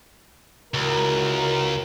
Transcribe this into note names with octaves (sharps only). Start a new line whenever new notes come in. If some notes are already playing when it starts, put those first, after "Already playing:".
C#2 E4 F#4 A#4